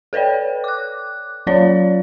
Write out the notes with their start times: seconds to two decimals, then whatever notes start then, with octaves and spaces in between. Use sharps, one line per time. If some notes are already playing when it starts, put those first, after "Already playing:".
0.13 A4 B4 C#5 D5 G5
0.64 D6 F#6
1.47 F#3 C#4 F4 C#5 D5 F5